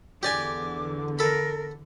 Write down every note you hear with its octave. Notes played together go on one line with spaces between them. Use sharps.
E2 D3 G4 D5 G#5 D6
A4 A#4 B5